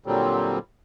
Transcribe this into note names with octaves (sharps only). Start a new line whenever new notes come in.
A#2 D3 F#3 G3 C4